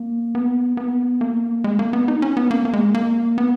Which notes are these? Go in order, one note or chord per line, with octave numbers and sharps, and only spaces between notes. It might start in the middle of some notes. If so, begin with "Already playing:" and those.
Already playing: A#3
B3
B3
A#3
G#3
A#3
B3
D#4
C#4
B3
A#3
A#3
G#3
A#3
B3